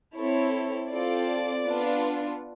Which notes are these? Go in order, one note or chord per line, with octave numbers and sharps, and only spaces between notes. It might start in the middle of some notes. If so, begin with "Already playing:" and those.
C4 E4 A4 C#5
C4 F4 A4 D5
B3 D4 F4